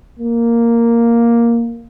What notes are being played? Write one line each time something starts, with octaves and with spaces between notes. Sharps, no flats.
A#3